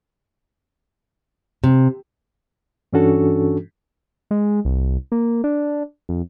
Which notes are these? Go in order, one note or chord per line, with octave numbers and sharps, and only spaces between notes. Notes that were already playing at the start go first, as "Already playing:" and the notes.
C3
G2 E3 C#4 D4 F#4 A4
G#3
C2
A#3
D4
F2